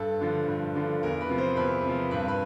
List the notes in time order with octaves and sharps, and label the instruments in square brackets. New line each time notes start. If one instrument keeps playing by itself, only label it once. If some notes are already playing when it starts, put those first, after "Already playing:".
Already playing: [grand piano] G2 A4
D3 F3
G2
D3 F3
E2 A#4
B4
C3 F3
C5
E2 B4
C3 F3
G2 B4
B4